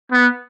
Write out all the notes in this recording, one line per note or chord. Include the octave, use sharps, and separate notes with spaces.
B3